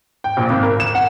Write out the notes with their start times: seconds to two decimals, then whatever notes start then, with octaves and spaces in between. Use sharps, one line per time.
0.24 G5
0.37 A#1
0.50 G#1
0.63 A#4
0.80 E7
0.95 F#5